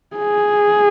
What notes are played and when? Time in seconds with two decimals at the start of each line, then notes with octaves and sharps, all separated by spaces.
0.16 G#4